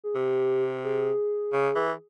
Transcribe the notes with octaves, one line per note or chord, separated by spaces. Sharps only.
G#4
C3 G4
G#4
C#3
E3